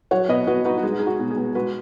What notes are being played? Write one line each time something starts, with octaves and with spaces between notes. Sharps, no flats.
F#3 C#5 F#5
B2 B4 D#5
B2 F#4 B4
D#4 F#4 B4
F#4
G#3 G#4
D#4 G#4
F#4
B2
G#4
B3
G#3 F#4 B4